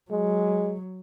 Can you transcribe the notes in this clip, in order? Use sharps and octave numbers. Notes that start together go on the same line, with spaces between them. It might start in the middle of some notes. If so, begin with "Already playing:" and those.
F#3 G#3